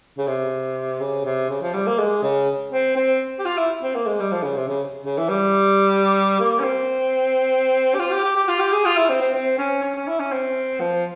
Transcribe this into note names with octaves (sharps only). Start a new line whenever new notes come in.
C#3
C3
C#3
C3
C#3
F3
G3
A#3
G#3
C#3
C4
C4
G4
F4
E4
C4
A#3
G#3
G3
F3
C#3
C3
C#3
C#3
E3
G3
A#3
C#4
C4
G4
F4
G4
G4
G4
F4
G4
G#4
F4
E4
C4
C4
C4
C#4
C#4
C#4
E4
C#4
C4
F3